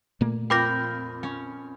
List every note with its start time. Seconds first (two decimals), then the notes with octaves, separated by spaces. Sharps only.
0.21 A#2 A3 A#3
0.50 F2 F4 A#4 G5 B5 D6 G6 A#6
1.23 C#4